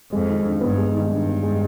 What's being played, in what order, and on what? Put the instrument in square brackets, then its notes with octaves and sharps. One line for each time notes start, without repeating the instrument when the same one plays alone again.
[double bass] F2 [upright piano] G#3
[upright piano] D#3
D4
[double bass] G2 [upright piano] B3
[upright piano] G#3
D#3
[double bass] G2 [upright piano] D4
[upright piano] B3
G#3